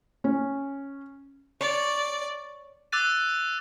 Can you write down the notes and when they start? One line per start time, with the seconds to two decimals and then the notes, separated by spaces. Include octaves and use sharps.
0.24 C#4
1.61 C#5 D5
2.92 D6 E6 F#6 A6 D#7